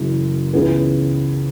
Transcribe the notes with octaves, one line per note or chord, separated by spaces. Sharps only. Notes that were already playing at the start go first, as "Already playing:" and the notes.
Already playing: F#1 F#2 E3 G#3
C#2 C#3 E3 B3 G#4